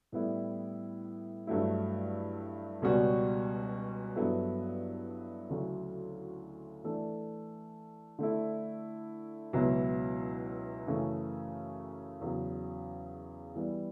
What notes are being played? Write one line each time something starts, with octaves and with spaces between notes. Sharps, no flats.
A2 G3 B3 E4
G2 F#3 A3 E4
C#2 B2 G3 C#4 F#4
G2 F#3 B3 E4 A4
D2 C#3 F#3 C#4 E4
E3 A3 D4 A4
D3 A3 E4
C#2 B2 F#3 B3 E4
F#2 C#3 E3 A3 C#4
E2 C#3 F#3
E3 G3 B3